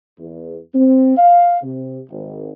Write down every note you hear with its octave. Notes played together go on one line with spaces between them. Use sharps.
E2
C4
F5
C3
G#1